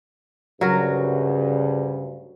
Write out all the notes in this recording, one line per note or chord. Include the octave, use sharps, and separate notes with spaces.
D2 G2 C#3 F#3 A#4